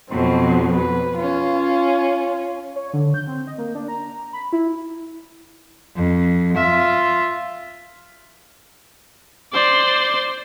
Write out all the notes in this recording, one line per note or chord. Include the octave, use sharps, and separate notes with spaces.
F2 B2 F#3 C4
B4
C#4 F4
C#5
D3
G6
C4
D#5
A#3
D4
A#5
B5
E4
F2
F4 E5
C5 D5